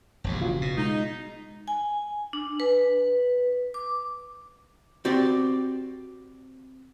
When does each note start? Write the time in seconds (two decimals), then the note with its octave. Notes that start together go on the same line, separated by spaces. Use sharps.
0.24 E1 A#1 G2
0.40 C#3 F4 F#4
0.62 B2
0.78 G#3 D#4
1.68 G#5
2.33 D4
2.60 B4
3.74 D6
5.05 C4 F#4 G4 D5